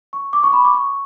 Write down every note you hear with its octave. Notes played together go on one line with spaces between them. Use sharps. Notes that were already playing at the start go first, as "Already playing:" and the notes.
C#6
D6
C#6
B5
D6
C#6